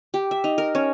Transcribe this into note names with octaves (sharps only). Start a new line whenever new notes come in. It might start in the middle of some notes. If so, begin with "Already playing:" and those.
G4
E5
D#4
A#4
C#4